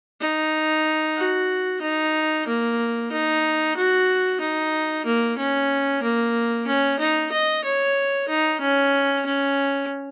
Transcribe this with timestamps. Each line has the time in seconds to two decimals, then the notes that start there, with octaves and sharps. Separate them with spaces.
0.21 D#4
1.17 F#4
1.82 D#4
2.47 A#3
3.12 D#4
3.77 F#4
4.41 D#4
5.06 A#3
5.38 C#4
6.03 A#3
6.67 C#4
6.99 D#4
7.32 D#5
7.64 C#5
8.28 D#4
8.61 C#4
9.26 C#4